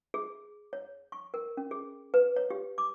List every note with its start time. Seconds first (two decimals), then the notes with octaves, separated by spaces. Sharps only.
0.14 G#4
0.73 C#5
1.12 C#6
1.34 A#4
1.57 C#4
1.71 G#4
2.14 B4
2.36 C#5
2.51 G4
2.78 D6